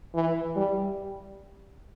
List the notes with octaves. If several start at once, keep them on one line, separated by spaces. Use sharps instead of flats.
E3
G3